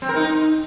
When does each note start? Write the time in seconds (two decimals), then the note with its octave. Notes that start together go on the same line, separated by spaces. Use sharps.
0.02 C4
0.09 A#4
0.16 D#4